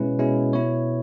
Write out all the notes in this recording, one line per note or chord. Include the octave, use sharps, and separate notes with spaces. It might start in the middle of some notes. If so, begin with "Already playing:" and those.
Already playing: B2 G#3 C#4 E4 B4
B2 G#3 C#4 E4
B2 B3 E4 C#5